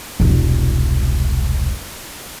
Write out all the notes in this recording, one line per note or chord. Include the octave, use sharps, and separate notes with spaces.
E1 C2